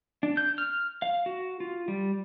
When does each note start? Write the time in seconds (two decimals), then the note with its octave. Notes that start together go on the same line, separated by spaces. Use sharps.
0.23 D4
0.37 G6
0.58 F6
1.02 F5
1.26 F#4
1.60 F4
1.88 G3